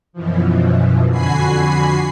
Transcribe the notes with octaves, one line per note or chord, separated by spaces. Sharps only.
F#2 B2 E3 F3
F2 D3 F#4 G#5 B5 C7